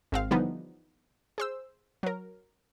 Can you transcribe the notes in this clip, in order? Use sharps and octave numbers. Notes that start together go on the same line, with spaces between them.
G#1 C4 F5
D3 E3 F3 G3 B3 D#4
G#4 C5 E6
F#3 A#4